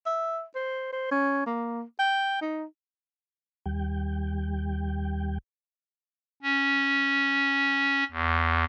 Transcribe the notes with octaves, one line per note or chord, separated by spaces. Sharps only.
E5
C5
C5
C#4
A#3
G5
D#4
D#2 G3 G5
C#4
E2